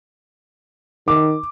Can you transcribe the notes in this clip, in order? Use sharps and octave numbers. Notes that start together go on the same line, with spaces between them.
D#3 D6